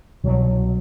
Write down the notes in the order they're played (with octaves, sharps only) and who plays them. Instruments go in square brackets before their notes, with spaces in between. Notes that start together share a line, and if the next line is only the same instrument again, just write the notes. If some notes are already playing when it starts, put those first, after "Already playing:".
[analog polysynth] C2 B2 F#3